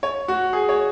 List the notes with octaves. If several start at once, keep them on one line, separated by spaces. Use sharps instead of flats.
C#5
F#4
G#4
C#5